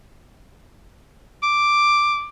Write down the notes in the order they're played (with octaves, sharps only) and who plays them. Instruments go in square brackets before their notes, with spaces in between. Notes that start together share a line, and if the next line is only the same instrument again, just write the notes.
[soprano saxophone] D6